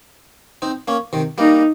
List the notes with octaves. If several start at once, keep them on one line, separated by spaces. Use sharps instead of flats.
C4 D#4
A#3 C#4
C3 D#3
G3 A#3 D#4